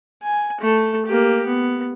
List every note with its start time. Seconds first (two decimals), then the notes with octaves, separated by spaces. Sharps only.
0.22 G#5
0.60 A3 A4
1.06 A#3 G4
1.45 B3